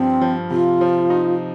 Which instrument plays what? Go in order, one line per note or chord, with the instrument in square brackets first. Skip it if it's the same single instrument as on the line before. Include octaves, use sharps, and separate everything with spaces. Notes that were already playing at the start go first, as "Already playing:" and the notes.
Already playing: [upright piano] G2 F3 [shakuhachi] C4
[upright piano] F3
[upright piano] C3 [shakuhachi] F4
[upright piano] F3
D#4